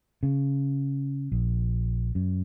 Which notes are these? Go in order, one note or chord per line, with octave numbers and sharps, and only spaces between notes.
C#3
A#1
F#2